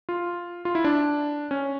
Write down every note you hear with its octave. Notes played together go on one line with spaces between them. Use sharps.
F4
F4
E4
D4
C#4